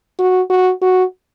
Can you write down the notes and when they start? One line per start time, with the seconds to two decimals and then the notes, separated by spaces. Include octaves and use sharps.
0.19 F#4
0.50 F#4
0.82 F#4